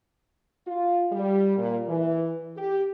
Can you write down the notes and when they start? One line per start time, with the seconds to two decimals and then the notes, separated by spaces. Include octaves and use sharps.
0.66 F4
1.11 G3
1.56 A#2
1.86 E3
2.56 G4